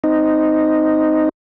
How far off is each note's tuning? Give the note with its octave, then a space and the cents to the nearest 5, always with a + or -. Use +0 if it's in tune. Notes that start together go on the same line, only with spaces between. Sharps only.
C4 -20 D#4 +0